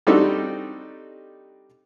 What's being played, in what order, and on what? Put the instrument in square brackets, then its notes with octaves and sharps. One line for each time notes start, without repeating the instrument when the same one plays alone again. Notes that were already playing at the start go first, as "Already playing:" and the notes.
[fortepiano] G3 C4 D4 D#4 F#4 A4